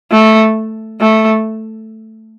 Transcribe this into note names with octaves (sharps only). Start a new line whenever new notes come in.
A3
A3